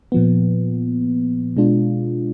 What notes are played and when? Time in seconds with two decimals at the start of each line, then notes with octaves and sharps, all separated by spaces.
0.12 A#2 F3 B3
1.57 B2 G#3 D4 F4